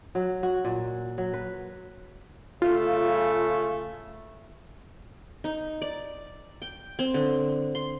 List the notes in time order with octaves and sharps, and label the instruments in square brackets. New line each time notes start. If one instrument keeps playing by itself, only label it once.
[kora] F#3
F#4
A#2
F#3
B4
[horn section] C#3 A3 [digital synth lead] F4
[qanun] D#4
D5
G5
C4
D3
C6